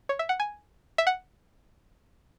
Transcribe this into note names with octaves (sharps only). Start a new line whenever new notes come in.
C#5
E5
F#5
G#5
E5
F#5